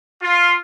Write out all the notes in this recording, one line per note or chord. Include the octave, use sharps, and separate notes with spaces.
F4